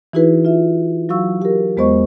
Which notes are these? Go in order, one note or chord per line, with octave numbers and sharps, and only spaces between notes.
E3 D#4 E4 F#4 G#4 B4
F4 E5
F#3 F#4 F5 C#6 E6
G4 A#4
E2 G#3 B3 C5 D#5 C#6